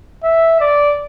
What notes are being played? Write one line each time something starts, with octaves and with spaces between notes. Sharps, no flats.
E5
D5